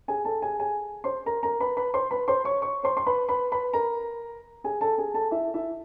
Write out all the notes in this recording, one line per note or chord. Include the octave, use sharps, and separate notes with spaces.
G#4 G#5
A4 A5
G#4 G#5
G#4 G#5
C5 C6
A#4 A#5
A#4 A#5
B4 B5
B4 B5
C5 C6
B4 B5
C5 C6
C#5 C#6
C#5 C#6
C5 C6
C6
B4 B5
B4 B5
B4 B5
A#4 A#5
G#4 G#5
A4 A5
G#4 G#5
A4 A5
E4 E5
E4 E5